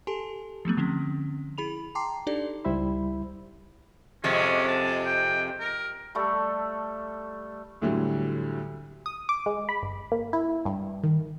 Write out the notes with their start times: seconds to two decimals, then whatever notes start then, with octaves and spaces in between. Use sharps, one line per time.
0.07 G4 A4 G#5 A5 C6
0.65 F3 F#3 A3 B3
0.77 D3 F3 C4 C#4
1.58 E4 G#4 B5 F7
1.95 G5 A5 A#5 C6 D6 C7
2.27 D4 D#4 G4 A4 D5
2.65 C#2 G3 E4 C5 E5 B5
4.24 F2 C3 G#3 C#4
4.68 A5
5.05 G5
5.60 A#4
6.15 G3 A3 A4
7.82 D2 A2 D3 F#3 G3
9.06 D#6
9.29 D6
9.46 G#3
9.69 B5
9.82 G1
10.12 A#3
10.33 E4
10.65 G2
11.03 D#3